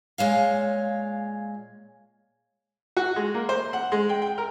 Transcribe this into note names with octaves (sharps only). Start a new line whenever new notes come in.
A#2 G#3 C#5 F5
F#4
G#3
A#3
C5
F#5
G#3
G5
G5
A#4